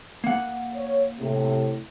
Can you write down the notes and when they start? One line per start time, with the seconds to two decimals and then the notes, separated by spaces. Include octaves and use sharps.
0.24 A#3 F#5
0.75 C#5
1.19 A2 C3